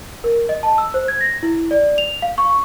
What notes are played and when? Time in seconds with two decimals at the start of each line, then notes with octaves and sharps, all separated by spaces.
0.24 A#4
0.49 D#5
0.63 A5
0.78 E6
0.94 C5
1.08 G#6
1.21 A#6
1.43 E4
1.71 D5
1.98 F7
2.22 F5
2.38 C#6